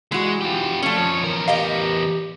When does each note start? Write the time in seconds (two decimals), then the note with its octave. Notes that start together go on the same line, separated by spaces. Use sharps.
0.12 E3 G#3 F#4
0.41 F4 G4
0.82 F3 A3 C#4
0.97 F2 C#5
1.24 E2 A#4
1.48 G4 D#5 F5